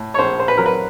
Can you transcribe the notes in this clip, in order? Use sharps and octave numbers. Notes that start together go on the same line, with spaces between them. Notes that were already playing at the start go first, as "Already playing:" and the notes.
Already playing: A2
C#5
A#1 C5
C5
B4
F#3 A#4
B4